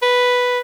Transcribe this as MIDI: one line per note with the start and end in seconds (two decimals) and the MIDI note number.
0.02 0.59 71